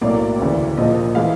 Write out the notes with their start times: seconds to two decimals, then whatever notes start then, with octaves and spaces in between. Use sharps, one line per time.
0.01 B1 A2 F#3 A#3 D5
0.39 D2 C#3 E3
0.77 A#1 A#2 F3 A#3 D#5
1.15 A2 E3 G#3 F5